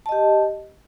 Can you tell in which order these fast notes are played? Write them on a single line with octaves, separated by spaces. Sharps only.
A5 D#5 G4